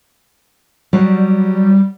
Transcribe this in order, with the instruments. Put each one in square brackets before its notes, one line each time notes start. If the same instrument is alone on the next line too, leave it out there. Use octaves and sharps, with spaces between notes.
[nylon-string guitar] F#3 [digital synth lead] G3